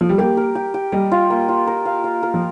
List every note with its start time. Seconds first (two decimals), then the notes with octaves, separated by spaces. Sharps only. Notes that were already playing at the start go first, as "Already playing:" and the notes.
0.01 F3
0.09 G3
0.18 A#3 G4
0.37 A#4
0.55 G4
0.74 G4
0.92 G3 D#5
1.12 F4
1.30 A#3
1.49 F4
1.67 A#4
1.85 F5
2.04 F5
2.23 A#4
2.34 F3